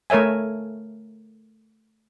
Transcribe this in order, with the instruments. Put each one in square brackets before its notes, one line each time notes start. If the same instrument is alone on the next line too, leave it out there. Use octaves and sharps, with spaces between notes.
[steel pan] A3 A#4 C#5 E5 G#5